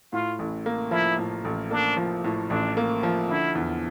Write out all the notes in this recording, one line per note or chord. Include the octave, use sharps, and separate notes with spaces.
A2 F4
A1
A#3
F3 E4
A2
A1
A#3 D4
F3
A2
A1 D4
A#3
F3
D3 E4
E2